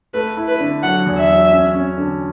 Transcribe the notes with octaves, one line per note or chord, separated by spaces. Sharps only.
A3 B4
E4
B4
D3
F#3 F#5
E2
E5
F#3
C#4
C#4
D3